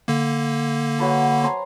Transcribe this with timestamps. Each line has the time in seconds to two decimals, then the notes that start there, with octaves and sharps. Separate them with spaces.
0.08 D3 A#3
0.99 F#3 B4 A5
1.44 C5 G#5 A#5